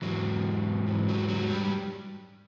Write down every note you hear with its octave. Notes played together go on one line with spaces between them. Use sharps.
G#2 E3 F#3
G#2 E3
F#3
F#3
G3